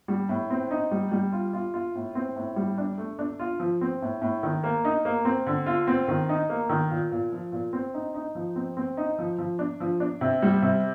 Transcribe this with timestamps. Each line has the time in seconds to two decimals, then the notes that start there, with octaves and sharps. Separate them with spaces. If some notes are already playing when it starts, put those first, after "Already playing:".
0.08 G3
0.29 A2
0.50 C4
0.71 D#4
0.91 G3
1.12 G3
1.32 F4
1.53 F4
1.74 F4
1.95 A2
2.15 C4
2.36 A2
2.56 G3
2.78 D4
2.98 A3
3.19 D4
3.39 F4
3.60 F3
3.81 C4
4.02 A2
4.21 A2
4.43 D#3
4.64 A#3
4.85 D#4
5.05 A#3
5.25 C4
5.47 D3
5.66 F4
5.87 C4
6.08 D#3
6.29 D#4
6.50 A#3
6.69 D#3
6.90 A#2
7.11 A#2
7.32 F3
7.52 A#2
7.73 C4
7.94 D#4
8.14 D#4
8.35 F3
8.56 C4
8.77 C4
8.97 D#4
9.18 F3
9.38 F3
9.59 D4
9.80 F3
10.00 D4
10.21 C3
10.42 G3
10.62 C3